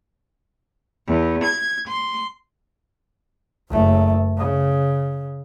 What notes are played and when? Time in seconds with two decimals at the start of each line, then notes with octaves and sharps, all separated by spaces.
1.07 E2
1.43 G#6
1.87 C6
3.70 F#1 A3
4.38 C#3